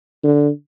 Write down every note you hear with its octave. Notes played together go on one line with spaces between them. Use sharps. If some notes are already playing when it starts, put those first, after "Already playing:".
D3